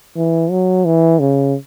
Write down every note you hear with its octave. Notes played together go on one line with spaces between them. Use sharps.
E3
F#3
E3
C#3